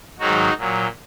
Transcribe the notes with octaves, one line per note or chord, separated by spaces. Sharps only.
G#2 D#3 F#3 D#4 F#4
A#2 F#3